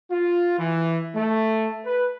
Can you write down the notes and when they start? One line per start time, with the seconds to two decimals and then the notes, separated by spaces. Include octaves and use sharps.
0.11 F4
0.59 E3
1.15 A3
1.86 B4